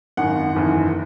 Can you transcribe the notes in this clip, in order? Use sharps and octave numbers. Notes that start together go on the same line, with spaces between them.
G#1 F#2 D#3 F#5
F#1 E2 D#3